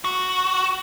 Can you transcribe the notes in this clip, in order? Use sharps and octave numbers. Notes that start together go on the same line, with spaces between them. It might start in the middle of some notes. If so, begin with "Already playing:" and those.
F#4